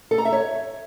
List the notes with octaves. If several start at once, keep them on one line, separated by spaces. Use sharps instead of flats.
A4
A#5
E5
C#5